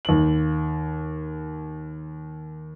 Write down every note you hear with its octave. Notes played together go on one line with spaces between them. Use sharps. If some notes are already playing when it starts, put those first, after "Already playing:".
D#2 F#7